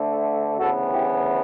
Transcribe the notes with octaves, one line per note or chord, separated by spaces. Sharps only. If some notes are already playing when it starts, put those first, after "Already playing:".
Already playing: D2 D3 A3
D2 C#3 E3 B3 F#4 A4
E4 G4